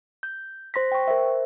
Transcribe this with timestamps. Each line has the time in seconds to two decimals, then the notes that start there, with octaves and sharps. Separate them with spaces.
0.23 G6
0.74 C5 C6 A#6 B6
0.92 G5 C#6
1.08 A#4 C5 E5